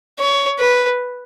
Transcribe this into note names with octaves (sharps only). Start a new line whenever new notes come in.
C#5
B4